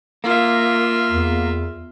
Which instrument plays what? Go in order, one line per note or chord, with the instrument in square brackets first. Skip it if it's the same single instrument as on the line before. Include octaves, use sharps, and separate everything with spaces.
[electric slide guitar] A#3 [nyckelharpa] F4 E5
[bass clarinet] E2